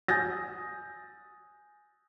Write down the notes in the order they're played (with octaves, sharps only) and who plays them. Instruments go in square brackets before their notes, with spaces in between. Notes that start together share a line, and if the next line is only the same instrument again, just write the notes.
[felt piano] G#5 D#6 G6 A6 A#6